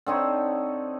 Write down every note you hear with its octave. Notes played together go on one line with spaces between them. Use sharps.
D3 C4 D#4 C#5